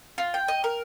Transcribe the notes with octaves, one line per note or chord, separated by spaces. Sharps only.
F4
G5
D#5
A#4